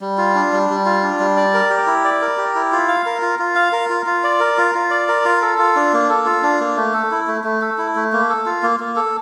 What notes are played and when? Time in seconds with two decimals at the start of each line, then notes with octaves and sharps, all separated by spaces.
0.01 G3
0.18 F4
0.35 D4
0.52 G3
0.70 G3
0.85 F4
1.03 D4
1.20 G3
1.37 D5
1.54 A#4
1.70 G4
1.87 E4
2.04 D5
2.22 A#4
2.38 G4
2.55 E4
2.72 F4
2.88 F5
3.06 A#4
3.22 F4
3.39 F4
3.55 F5
3.72 A#4
3.90 F4
4.06 F4
4.24 D5
4.40 A#4
4.58 F4
4.75 F4
4.91 D5
5.08 A#4
5.25 F4
5.42 A4
5.58 F4
5.76 D4
5.93 A#3
6.09 A4
6.26 F4
6.43 D4
6.60 A#3
6.76 A3
6.94 A4
7.11 E4
7.27 A3
7.44 A3
7.61 A4
7.78 E4
7.95 A3
8.12 A#3
8.30 A4
8.46 F4
8.63 A#3
8.80 A#3
8.96 A4